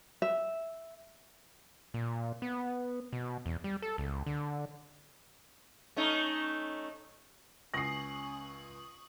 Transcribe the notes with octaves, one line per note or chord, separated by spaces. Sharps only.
E5
A#2
B3
B2
E2
G3
A4
C#2
D3
A3 C#4 D#4
C#2 C#4 G#5 C#6 D#6 A#6 C7 F#7